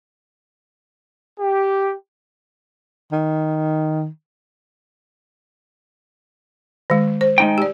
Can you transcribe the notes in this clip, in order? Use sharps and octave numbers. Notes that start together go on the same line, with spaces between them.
G4
D#3
D#3 G#3
C5
G#3 D#4 G5
G4 D5